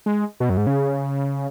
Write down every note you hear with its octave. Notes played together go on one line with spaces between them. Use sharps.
G#3
B2
F#2
G#2
C#3